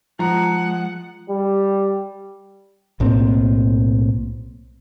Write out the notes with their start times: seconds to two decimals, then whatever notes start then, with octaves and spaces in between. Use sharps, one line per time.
0.19 F3 G#3 F#5 A#5
1.30 G3
3.00 B1 A2 A#3 C4